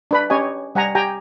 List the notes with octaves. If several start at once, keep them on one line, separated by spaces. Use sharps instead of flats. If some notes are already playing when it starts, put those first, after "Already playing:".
D4 B4 B5
C#4 G4 C#5 D#5 G#5
G3 F#5 G#5 A#5
G4 G5 G#5 A#5